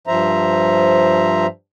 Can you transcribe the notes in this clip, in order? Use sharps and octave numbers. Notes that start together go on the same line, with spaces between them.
G2 F3 C5 E5 A#5